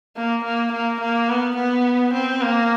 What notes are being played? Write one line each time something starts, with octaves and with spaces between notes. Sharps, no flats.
A#3
A#3
A#3
A#3
B3
B3
C4
A#3